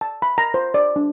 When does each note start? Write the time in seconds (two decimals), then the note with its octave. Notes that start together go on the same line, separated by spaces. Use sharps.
0.01 A5
0.22 B5
0.38 A#5
0.54 C5
0.74 D5
0.96 D4